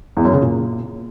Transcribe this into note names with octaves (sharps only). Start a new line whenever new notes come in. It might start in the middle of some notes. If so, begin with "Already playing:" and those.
E2
F#2
C#3
A#2